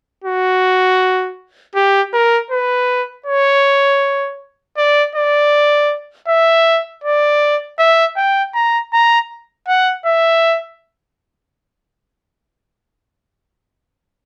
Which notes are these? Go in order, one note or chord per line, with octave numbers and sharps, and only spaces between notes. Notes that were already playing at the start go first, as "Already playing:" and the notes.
F#4
G4
A#4
B4
C#5
D5
D5
E5
D5
E5
G5
A#5
A#5
F#5
E5